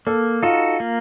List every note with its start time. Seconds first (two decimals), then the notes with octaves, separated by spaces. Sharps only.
0.07 A#3 A4
0.42 D#4 F4 F#4 A4
0.80 A#3